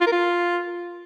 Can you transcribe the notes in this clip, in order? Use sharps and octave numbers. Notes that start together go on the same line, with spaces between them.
F4
A#4
F4